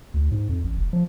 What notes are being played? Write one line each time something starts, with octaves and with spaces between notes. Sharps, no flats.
D2
G#2
F2
A1
F1
F3